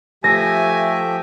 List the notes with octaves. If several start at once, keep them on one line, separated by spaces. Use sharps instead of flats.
F3 A3 G4 E5 G#5 A#6